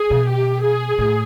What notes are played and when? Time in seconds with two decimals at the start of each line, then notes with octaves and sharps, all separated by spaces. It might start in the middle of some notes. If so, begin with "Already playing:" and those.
Already playing: G#4
0.10 B2
0.28 G4
0.63 G#4
0.98 A2